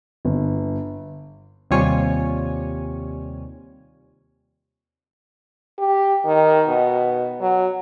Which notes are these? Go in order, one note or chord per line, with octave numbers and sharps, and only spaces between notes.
G1
D#2 C3 G3 F4 C#5 G#5
G4
D#3
B2
F#3